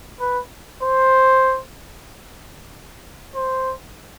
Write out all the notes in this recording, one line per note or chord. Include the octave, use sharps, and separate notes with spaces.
B4
C5
C5